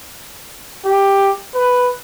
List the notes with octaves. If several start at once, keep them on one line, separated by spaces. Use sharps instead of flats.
G4
B4